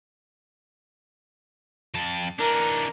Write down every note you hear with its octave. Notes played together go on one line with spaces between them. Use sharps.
F2 A5
E3 D4 A#4